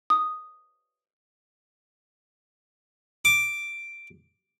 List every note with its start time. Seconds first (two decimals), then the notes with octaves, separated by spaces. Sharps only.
0.10 D#6
3.25 D6